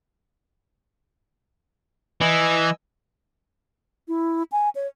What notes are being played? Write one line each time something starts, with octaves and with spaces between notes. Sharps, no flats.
E3 D#5 G#5 E6
E4
G#5
C#5